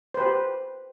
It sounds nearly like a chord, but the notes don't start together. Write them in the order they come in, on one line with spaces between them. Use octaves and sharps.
C5 B4 G4